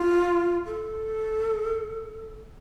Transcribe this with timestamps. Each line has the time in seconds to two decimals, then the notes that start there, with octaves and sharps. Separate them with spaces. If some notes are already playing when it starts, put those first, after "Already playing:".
Already playing: F4
0.66 A4